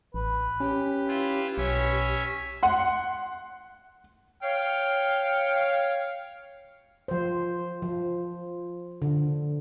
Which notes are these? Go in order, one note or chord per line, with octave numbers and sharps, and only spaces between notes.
A1 B4
C#4 G4
E4 F4
B1 C#4 C#5 E5
F#5 C6
C#5 F5 G5
F3 C5
F3
D3